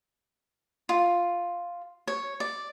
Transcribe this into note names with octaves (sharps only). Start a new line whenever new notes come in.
F4
C#5
D5